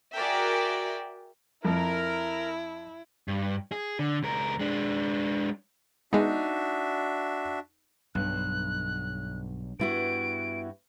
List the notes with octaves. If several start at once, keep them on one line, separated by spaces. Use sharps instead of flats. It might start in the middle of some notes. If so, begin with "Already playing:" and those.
F#4 G#4 A#4 D5 E5 G5
F2 E4 A#4
G2
G#4
D3
C#2 A#4
G#3 D4
G#3 B3 D4 D#4 F#4 E5
B1 G2 F#6
G2 B3 E4 F#4 D7